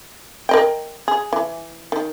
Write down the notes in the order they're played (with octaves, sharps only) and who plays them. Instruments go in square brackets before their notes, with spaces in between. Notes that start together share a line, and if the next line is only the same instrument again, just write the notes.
[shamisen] A#4 D#5 G5
G#4
E3
D#3